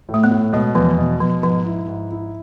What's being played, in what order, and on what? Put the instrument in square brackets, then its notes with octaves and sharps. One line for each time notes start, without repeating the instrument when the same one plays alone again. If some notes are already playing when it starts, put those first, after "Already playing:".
[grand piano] A2
[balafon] A3
B3
[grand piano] A2
[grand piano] B2 [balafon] G#3
[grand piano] E2 [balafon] F3
[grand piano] B2
[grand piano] B2 [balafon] F3
[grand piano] G#2 [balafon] F3
[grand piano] E4
G#2
E4